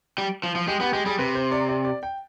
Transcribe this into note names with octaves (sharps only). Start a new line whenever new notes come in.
G3
F3
F3
G#3 G4
B3 G4
G#3 G4
G3 G#4
C3 B4
C5
D5
D5
D5
G5